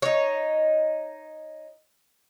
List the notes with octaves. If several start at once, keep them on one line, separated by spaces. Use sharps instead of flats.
D#4 C#5